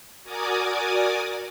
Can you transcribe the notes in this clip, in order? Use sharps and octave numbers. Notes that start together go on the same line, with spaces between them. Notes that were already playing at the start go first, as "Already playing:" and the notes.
F#4 A#4 D5 G#5 D6 D#6